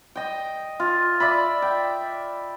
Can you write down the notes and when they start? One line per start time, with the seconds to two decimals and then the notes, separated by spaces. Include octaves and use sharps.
0.15 D#5 G5
0.80 F4
1.20 D5 E5 B5
1.62 G5